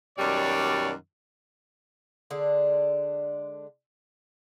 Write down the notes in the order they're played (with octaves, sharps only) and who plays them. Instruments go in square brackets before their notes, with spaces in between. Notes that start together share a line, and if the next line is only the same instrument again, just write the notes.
[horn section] F#2 B2 D#3 G3 C#5 D5
[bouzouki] D3 G#3 D4